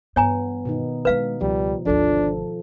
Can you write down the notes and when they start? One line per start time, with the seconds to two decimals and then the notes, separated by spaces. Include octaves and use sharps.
0.16 G2 E3 B3 C#5 G#5 A#5
0.65 B2 D#3 D#4
1.05 G#3 D4 B4 F5
1.41 C#2 F3 G3
1.86 G#1 D2 F3 D4 A4